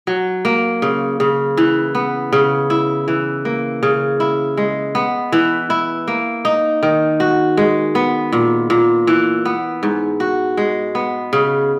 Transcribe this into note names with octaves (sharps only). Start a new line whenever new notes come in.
F#3
A#3
C#3
C#3
E3
B3
C#3
E4
E3
A#3
C#3
E4
G#3
B3
E3
E4
A#3
D#4
D#3
F#4
G#3
B3
A#2
A#2
E3
B3
G#2
F#4
G#3
B3
C#3